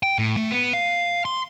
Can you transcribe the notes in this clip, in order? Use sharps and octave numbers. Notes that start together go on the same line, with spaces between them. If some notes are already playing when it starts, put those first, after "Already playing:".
G5
A2
A3
B3
F5
C6